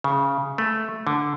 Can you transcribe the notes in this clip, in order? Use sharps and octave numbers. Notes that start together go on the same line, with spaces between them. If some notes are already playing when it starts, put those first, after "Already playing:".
C#3
A3
D3